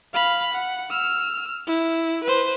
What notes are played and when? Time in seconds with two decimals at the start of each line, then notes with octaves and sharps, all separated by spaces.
0.14 F5 B5
0.53 F#5
0.91 E6 F6
1.67 E4
2.24 B4 C5